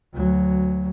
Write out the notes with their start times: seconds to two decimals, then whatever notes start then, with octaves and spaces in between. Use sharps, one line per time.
0.14 D2 F#3